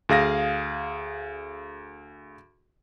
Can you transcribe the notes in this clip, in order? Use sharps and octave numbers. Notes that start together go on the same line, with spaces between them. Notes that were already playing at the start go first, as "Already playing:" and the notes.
D2 G#4 F5 A#6